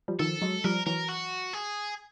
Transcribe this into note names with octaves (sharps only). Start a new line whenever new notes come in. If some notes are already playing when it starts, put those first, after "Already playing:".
F3 G3
D#3 F3 A4
F#3 G#3
F3 G3 A#4
E3 F#3 A#4
F#4
G#4